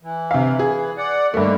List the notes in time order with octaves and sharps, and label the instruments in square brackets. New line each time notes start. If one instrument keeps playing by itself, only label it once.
[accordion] E3
[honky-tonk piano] C3 F5
G#4
[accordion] D5 F#5
[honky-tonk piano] G2 A3 [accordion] D3 D#3 A#3